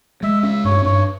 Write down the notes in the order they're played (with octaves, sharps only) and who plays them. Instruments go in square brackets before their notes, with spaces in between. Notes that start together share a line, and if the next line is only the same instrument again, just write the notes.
[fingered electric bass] G#3 [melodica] E5
[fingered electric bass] C#4 [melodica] E5
[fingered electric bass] G2 [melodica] C#5
[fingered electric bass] G2 [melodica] C#5